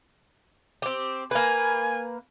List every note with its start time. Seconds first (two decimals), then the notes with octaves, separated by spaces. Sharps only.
0.82 C4 G4
1.31 A#3 B4 G#5